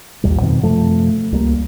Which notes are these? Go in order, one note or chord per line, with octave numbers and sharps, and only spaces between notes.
A1 D#2 A#2 G3
F2 B2 D#3 C4
F#2 C3 F3 A3
C#2 G3 A#3